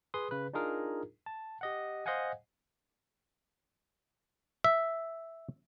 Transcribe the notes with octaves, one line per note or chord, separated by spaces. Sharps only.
G#4 B4 C6 D#6
C#3 B4
D4 D#4 F4 G#4 A#4
A5
G4 D#5 F#5
C5 D#5 F5 F#5 G#5
E5